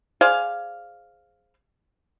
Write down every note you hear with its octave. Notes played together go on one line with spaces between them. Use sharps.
G#4 C5 D5 F5